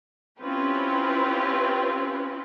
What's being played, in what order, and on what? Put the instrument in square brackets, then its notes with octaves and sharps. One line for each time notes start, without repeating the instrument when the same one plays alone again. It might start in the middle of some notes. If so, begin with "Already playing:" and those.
[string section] C4 C#4 E4 F4 G4 B4